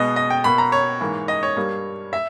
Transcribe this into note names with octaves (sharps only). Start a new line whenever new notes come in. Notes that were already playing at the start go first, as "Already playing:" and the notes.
Already playing: B2 G#3 B3 D#5
D#5
G5
B2 A#3 B5
A#5
C#5
G#2 E3 A#3
D#5
C#5
G2 G3 A#3
E5